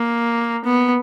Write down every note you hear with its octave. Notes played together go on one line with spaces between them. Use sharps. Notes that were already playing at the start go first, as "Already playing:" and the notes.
Already playing: A#3
B3